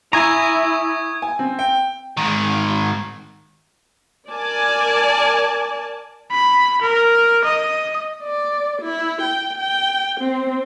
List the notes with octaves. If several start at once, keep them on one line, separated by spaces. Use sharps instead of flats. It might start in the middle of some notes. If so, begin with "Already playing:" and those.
E4 G#5 A#5 C#6 D#6 G#6
G#5
C4
G5
G#2 D#3
A#4 D5 G#5 A5
B5
A#4
D#5
D5
E4
G5
G5
C4